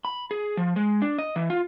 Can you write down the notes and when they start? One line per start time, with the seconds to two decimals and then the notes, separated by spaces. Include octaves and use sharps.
0.05 B5
0.31 G#4
0.57 F3
0.76 G#3
1.02 D4
1.19 D#5
1.36 E3
1.50 F4